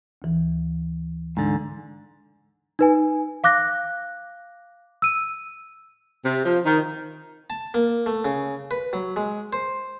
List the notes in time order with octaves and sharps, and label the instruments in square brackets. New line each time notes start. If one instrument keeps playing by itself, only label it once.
[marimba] D2 E3
[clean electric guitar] G#2 D3
[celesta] D#4 B4 G#5
F5 D6 F#6 A#6
E6 D#7
[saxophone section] C3
F3
D#3
[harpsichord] A5
A#3
A3
C#3
B4
F#3
G#3
C5